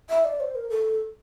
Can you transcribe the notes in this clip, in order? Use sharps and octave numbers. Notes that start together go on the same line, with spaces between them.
E5
D5
C5
A#4
A4